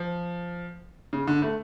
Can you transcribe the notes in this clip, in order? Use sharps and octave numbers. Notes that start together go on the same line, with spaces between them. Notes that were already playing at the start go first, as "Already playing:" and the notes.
Already playing: F3
C#3
D3
A3